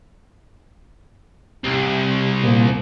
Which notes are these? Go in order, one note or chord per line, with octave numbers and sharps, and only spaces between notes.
C2 G4
A#2 C5